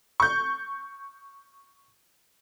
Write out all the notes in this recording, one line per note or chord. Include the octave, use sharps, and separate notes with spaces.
C#6 G6